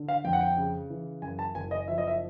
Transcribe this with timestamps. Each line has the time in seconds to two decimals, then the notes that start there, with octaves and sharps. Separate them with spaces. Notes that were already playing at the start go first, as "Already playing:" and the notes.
Already playing: D3
0.08 F5
0.25 F2 G5
0.33 F#5
0.41 G5
0.57 C#3
0.90 E3
1.22 F#2 G#5
1.39 A5
1.55 F#1 G#5
1.71 D#5
1.88 F3 E5
1.98 D#5
2.07 E5